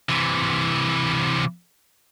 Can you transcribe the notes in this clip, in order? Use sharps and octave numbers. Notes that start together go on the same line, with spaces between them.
C3 E3